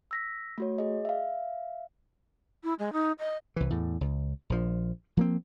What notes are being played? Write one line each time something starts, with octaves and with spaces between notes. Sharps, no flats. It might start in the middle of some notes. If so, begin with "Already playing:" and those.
E6 A#6 B6
A3 F#4 C#5
G#4 D#5
E5 F5
E4
G#3
D#4
D#5
C2 E3
E2 A2
C#2
A#1 F3
F3 A#3 C4